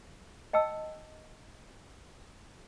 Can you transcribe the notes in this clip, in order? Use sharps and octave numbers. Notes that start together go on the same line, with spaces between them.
D#5 G5 A5 E6